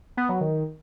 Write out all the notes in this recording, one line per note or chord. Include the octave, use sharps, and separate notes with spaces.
B3
F#3
D#3